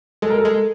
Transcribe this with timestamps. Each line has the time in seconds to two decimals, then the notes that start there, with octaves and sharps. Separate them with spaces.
0.22 G#3 A4
0.30 A#4
0.38 A4
0.45 G#3